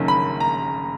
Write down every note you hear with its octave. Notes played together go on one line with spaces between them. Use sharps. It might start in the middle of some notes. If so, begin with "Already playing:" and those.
Already playing: F#1 F#2 D#3 A#3 C#4
B5
A#5